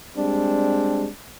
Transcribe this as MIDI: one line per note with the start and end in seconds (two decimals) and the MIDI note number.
0.17 1.08 55
0.17 1.08 56
0.17 1.08 60
0.17 1.08 62